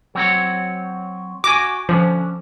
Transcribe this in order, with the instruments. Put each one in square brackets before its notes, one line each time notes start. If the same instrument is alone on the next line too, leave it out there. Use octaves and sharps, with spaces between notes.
[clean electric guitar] F#3 C4 C#5
[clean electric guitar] F#4 G#5 [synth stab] D6
[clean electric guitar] D3 C#4 [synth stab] F3